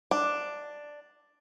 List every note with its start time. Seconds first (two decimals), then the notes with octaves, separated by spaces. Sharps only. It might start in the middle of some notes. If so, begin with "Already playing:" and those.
0.11 D4